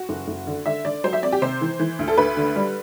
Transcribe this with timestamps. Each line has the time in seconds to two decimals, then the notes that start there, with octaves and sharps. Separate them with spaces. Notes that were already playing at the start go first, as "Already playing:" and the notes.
Already playing: F#4
0.09 F#1
0.28 F#1
0.47 D3
0.66 D3 E5
0.85 D3 D5
1.04 F#3 C5
1.13 E5
1.22 C4 D5
1.32 G4
1.42 C3 C5
1.61 E3
1.80 E3
1.99 D2
2.08 A4
2.18 D2 B4
2.37 D3
2.56 G3